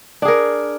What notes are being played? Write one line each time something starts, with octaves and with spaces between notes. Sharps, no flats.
D4 G#4 A#4